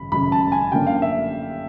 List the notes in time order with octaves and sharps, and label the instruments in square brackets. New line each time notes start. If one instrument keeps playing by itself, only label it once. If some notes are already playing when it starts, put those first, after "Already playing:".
Already playing: [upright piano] G#1 F#2 C#3 B5
G#1 F#2 C#3 B5
A5
G#5
F#2 D3 F3 A#3 D4 G5
F5
E5